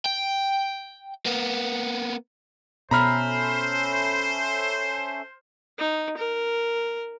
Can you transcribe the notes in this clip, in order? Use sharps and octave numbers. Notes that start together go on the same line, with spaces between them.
G5
A#3 B3
B2 C#4 A4 C5 E5 A#5 B5 F6
D#4
A#4